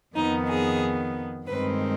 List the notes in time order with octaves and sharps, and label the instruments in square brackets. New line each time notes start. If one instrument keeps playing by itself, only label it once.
[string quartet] F2 D#3 B3 D#4
G#4
G2 D#3 G#3 C4 B4